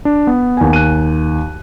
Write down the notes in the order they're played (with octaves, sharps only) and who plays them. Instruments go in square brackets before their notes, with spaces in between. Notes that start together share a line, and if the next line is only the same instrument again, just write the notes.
[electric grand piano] D4
B3
[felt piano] D#2 G#5
[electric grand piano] F#6 D#7